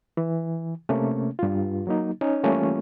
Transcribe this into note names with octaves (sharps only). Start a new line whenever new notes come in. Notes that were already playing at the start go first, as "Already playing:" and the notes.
E3
C3 A3 A#3 C#4
G2 F4
F#3 A#3 D#4
C#4 D#4 C#5
E3 G3 A3 A#3 C#4 F4